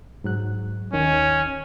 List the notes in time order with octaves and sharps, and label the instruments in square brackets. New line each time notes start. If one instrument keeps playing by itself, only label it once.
[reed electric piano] G#2 F#3 F#6
[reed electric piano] D#2 D#3 [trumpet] C#4